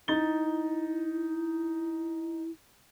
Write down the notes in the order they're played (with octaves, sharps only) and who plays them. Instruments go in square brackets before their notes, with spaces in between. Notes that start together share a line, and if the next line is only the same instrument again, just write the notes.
[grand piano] D#4 A6 G7 [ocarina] E4